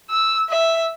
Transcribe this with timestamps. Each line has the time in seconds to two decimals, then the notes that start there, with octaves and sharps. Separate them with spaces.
0.10 E6
0.49 E5